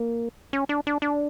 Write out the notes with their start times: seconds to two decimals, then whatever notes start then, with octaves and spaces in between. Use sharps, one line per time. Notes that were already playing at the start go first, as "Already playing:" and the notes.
Already playing: A#3
0.53 C#4
0.69 D4
0.87 D4
1.02 D4